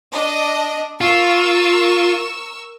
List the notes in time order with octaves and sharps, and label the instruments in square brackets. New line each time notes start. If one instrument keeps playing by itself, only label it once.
[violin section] D4 D#5
[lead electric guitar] F4 [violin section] A#4 C#6 E6